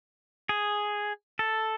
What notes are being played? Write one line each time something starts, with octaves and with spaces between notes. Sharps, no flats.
G#4
A4